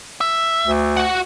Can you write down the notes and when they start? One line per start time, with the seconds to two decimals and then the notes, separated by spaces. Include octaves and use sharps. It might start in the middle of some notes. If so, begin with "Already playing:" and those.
0.21 E5
0.67 D2
0.97 F#4 F#5